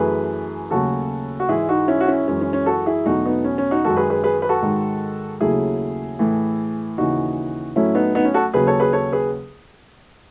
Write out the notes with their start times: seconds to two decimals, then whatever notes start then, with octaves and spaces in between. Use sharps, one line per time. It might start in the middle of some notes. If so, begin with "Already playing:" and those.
Already playing: F#2 E3 A3 G#4 B4
0.71 D#2 C#3 F#3 A3 F#4 A4
1.40 F#4
1.49 G#2 E3 G#3 E4 G#4
1.69 D#4 F#4
1.88 C#4 E4
2.01 F#4
2.08 C#4 E4
2.28 F#2 E3 G#3 C#4
2.41 C#4
2.53 C#4
2.66 F#4 A4
2.86 E4 G#4
3.06 E2 B2 F#3 A3 D#4 F#4
3.26 B3 D#4
3.44 C#4
3.58 C#4
3.71 D#4 F#4
3.84 F#2 D#3 G#3 F#4 A4
3.97 G#4 B4
4.10 G#4 B4
4.24 G#4 B4
4.42 B4
4.49 F#4 A4
4.62 G#2 D#3 G#3
5.41 D#2 C#3 F#3 A3 E4 G#4
6.19 A2 E3 A3
6.97 D#2 C#3 E3 D#4 F#4
7.76 A2 F#3 A3 C#4 E4
7.95 B3 D#4
8.15 B3 D#4
8.25 C#4
8.34 F#4 A4
8.54 D#2 C#3 F#3 G#4 B4
8.67 A4 C#5
8.80 G#4 B4
8.93 A4 C#5
9.12 G#4 B4